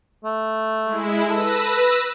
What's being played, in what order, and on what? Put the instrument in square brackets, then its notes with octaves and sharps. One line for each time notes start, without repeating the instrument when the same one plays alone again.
[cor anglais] A3
[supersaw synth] G#3 E4
[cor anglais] A4 [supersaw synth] B4 E6 A#6